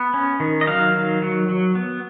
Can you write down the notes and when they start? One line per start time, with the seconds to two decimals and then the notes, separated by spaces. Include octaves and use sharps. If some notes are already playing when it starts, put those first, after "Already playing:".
Already playing: B3
0.14 C#4
0.40 D#3
0.61 D#5
0.67 F#3 F5
0.95 D#3
1.22 F#3
1.49 F#3
1.75 B3